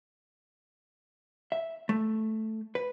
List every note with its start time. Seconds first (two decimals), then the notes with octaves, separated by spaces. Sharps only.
1.52 E5
1.89 A3
2.75 B4